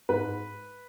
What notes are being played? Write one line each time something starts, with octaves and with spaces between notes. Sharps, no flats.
G#2 B4